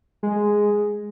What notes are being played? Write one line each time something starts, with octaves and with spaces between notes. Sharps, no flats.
G#3